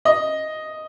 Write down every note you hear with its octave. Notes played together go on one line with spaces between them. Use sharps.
D#5